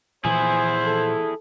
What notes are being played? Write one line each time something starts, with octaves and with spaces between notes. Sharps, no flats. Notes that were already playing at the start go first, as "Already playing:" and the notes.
A#2 E3 F3 E4 G#4 C5 G#5
A4